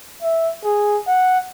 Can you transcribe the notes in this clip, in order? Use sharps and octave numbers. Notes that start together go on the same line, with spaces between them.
E5
G#4
F#5